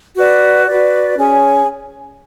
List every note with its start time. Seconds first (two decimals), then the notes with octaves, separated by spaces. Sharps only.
0.16 F#4 B4 D5
0.67 F#4 B4 D5
1.17 C#4 G#4 C#5 G#5